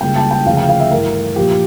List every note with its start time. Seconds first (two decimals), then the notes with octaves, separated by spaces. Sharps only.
0.01 C#2 C#3 G3 A#3 G5
0.16 A5
0.31 G5
0.46 D2 C#3 F3 F5
0.57 G5
0.69 F5
0.80 E5
0.91 G2 E3 A3 A#4
1.36 A#2 F3 A#3 G4